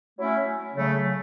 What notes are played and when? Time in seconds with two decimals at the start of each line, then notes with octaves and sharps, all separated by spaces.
0.17 F#3 A3 C#4 E4
0.74 C#3 F#3 A3